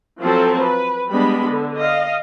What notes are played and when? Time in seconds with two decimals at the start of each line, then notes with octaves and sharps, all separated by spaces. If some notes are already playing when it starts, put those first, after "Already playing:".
0.21 F3 F#3 C4 A4 A5
0.61 B4
1.11 G3 G#3 B3 D4 B5
1.49 D3
1.79 D#5 F5